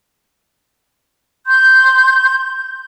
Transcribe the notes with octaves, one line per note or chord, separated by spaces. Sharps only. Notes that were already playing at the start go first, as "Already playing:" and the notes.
C6 G6